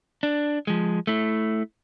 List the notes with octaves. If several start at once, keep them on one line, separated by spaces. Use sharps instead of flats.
D4
F3 G#3
A3 E4